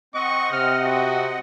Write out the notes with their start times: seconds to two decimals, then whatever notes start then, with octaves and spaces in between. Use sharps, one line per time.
0.14 C4 D#5 F#5 C#6
0.52 C3 F6
0.84 F#4